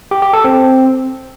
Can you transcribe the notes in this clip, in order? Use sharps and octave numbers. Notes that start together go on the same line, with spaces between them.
G4
G4
A4
C4